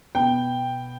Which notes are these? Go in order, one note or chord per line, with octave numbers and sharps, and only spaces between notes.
B2 B3 G5